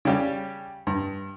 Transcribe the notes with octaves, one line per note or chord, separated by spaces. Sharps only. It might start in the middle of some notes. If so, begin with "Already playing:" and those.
C#3 G3 G4
G2